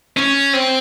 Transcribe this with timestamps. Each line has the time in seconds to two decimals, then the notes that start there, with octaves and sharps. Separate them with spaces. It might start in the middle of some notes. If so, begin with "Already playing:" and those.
0.17 C#4
0.53 C4